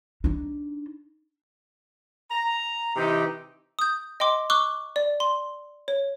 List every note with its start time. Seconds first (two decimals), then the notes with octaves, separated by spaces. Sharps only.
0.24 D4 D#4
2.31 A#5
2.96 C3 E3 D#4 G4
3.79 D#6 G6
4.20 D#5 G5 C6 D6
4.50 C#6 D6 E6 F#6 G7
4.96 D5
5.20 C6
5.88 C#5